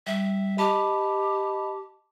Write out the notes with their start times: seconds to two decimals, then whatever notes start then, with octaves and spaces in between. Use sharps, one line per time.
0.07 G3 E5
0.58 G4 D#5 A5 B5